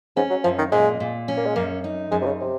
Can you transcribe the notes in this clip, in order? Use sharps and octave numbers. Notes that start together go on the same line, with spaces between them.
G#2 C#4
F#3
F#2 F3
D#3
A#2 G#3
A#2
C#4
A#3
G#3
F#2 A#3
D#4
F#2 G#3
C3
C#3
C3